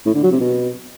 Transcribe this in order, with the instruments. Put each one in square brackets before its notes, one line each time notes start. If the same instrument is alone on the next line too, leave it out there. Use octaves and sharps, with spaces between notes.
[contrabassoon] A2
D3
F#3
C3
B2